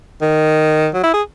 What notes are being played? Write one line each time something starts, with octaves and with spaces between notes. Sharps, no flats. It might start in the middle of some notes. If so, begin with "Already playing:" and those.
D#3
F#3
E4
G#4